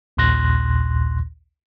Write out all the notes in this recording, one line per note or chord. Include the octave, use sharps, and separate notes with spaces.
A#1 D#2 A#2 C6 F#6 A#6